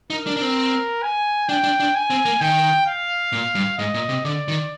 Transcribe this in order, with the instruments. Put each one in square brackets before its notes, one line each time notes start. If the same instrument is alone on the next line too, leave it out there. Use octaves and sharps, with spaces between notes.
[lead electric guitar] D#4 [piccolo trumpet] A#4
[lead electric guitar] D4
D4
C4
[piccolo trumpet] G#5
[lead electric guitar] D4 [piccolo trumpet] G5
[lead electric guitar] D4
D4
[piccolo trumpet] G#5
[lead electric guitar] C4
A#3
[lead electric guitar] D#3 [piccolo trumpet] G5
[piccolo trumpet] F5
[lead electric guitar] A#2
G2
[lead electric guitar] G#2 [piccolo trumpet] D#5
[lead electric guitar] A#2
C3
[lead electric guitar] D3 [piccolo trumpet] D5
[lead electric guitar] D#3